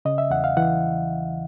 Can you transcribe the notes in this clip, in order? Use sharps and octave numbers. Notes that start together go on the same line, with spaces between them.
C#3 D#5
E5
E2 F#5
F5
E3 F#5